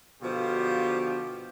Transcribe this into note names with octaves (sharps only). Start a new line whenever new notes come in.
B2 D3 F3 F4 G4